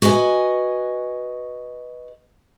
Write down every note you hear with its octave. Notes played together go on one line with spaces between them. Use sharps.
F#4 B4 D#5 G#5